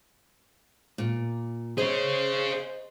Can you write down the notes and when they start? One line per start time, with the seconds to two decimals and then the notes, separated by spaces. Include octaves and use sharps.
0.98 A#2
1.78 G#4 C5 C#5 D#5